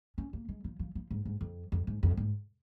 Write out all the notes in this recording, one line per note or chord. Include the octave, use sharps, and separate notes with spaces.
C#4
A#3
G#3
F3
F3
F3
G#2
G#2
F2
F2
G#2
F2
G#2